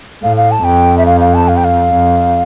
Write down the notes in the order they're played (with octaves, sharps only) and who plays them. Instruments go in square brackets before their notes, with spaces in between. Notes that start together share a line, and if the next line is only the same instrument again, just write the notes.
[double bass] A2 [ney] F5
[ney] F5
A5
[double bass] F2 [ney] G5
[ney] E5
F5
F5
A5
F5
G5
F5
[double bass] F2